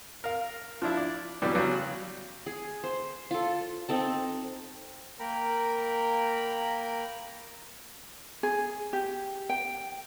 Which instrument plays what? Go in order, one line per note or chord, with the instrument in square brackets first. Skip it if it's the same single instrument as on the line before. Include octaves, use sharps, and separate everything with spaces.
[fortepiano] A#4 F5
F3 D4 E4
D5
G2 B2 D3 E3 F#3 G3
C#3 F#3 G3
[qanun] G#4
C5
F4 A4
C4 D#4 A4 A5
[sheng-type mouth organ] A#3 A#4 G5 A#5 B5
[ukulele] G#4
G4
G5